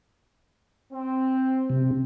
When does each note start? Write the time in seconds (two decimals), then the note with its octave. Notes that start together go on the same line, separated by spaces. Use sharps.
0.92 C4
1.70 C3